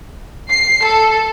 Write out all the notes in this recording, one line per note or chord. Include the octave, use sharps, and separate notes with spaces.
C7
A4